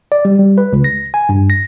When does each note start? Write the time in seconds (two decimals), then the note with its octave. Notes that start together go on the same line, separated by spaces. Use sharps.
0.12 D5
0.25 G3
0.39 G3
0.58 B4
0.73 C#2
0.84 A#6
1.14 G#5
1.29 G2
1.50 A#6